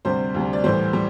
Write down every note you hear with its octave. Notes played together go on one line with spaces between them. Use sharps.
D2 C3 G3 C5
D2 C3 G3
D5
A2 E3 G3 C5
G3